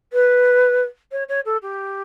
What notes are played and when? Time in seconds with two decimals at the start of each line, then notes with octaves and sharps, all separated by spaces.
0.13 B4
1.12 C#5
1.29 C#5
1.46 A4
1.62 G4